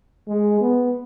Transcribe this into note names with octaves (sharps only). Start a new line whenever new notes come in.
G#3
B3